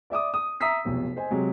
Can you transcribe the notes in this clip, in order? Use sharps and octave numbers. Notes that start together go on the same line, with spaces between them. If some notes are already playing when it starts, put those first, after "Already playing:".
D5 E5 D6 D#6
D#6
E5 A#5 D#6 E6 B6 C7
F1 B1 F2
C5 D#5 G#5
C3 F#3 G#3